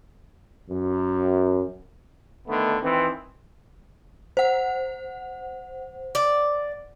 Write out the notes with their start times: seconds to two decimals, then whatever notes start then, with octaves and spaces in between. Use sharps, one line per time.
0.69 F#2
2.48 D3 D#3 A3 B3
2.82 D#3 E3 C4
4.37 C5 F#5
6.15 D5